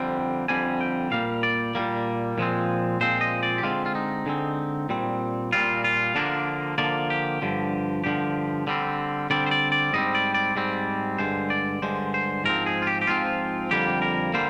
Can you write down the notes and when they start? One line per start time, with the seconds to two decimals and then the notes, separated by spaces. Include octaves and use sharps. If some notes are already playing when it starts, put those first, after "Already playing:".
Already playing: F2 D3 G3 C4 G5
0.48 F2 D3 G3 C4 G#5
0.81 G5
1.11 A#2 G3 A#3 F5
1.43 D5
1.75 A#2 G3 A#3
2.38 A#2 F3 G#3 C4
3.01 A#2 F3 G#3 C4 C5
3.21 D#5
3.43 D5
3.58 G4
3.63 D3 G#3 C4 F4
3.86 F4
3.95 D#4
4.26 D3 G#3 C4
4.89 A#2 G3 C4
5.53 A#2 G3 C4 F4
5.84 F4
6.15 D3 F3 A#3 D4
6.78 D3 F3 A#3 D5
7.10 G4
7.42 G2 D3 F3
8.04 G2 D3 F3 G4
8.67 D3 G3 C4
9.30 D3 G3 C4 D5
9.46 C5
9.51 D5
9.72 D5
9.93 G#2 G3 C4 D#5
10.15 D5
10.34 D5
10.56 G#2 G3 C4
11.18 G2 D3 G#3 C5
11.50 D5
11.82 G2 D3 G#3 C5
12.14 C5
12.44 G#2 F3 C4 A#4
12.66 G#4
12.82 F4
12.87 G4
13.02 G4
13.07 G#2 F3 C4 F4
13.71 F2 D3 G3 A#3 G4
14.02 A#4
14.34 D3 G3 A#3 C5